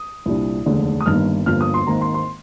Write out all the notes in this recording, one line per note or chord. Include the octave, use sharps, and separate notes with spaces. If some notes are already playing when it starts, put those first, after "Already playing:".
Already playing: D#6
C2 A#2 G3 D4
F1 D#2 D3 G#3 D4
D#6
G1 G2 D#3 A#3 D#4 F6
G1 G2 D3 F3 A#3 F6
D#6
C6
G#1 G#2 D#3 A#3 A#5
C6
C6